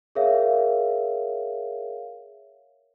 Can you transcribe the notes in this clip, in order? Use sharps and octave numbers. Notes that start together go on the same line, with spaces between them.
G#4 A#4 C#5 E5 F5